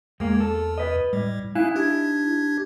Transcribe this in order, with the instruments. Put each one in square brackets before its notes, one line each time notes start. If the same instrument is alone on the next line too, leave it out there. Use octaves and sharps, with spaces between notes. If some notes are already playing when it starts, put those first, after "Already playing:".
[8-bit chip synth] E2 [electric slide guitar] G#3 A#3
[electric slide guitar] A4
B4 D#5
[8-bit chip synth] A2 [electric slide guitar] G3
[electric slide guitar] D#4 E4 [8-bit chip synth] F5 G#5 F#6
[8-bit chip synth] D4 G4 G#6